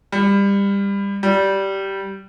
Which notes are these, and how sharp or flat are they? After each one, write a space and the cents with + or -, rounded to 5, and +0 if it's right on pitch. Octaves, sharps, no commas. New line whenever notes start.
G3 +25
G3 -15